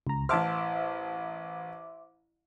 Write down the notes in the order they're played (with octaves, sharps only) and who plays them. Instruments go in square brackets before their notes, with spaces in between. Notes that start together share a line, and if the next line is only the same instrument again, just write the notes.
[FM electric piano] C#2 A#5
[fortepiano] A1 A5 F6 [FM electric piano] C5 E5 D6